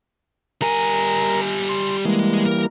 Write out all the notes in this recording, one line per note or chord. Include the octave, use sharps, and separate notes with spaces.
G3 A#4 G#5 A#5
C6
E3 G3 G#3 A#3
A#4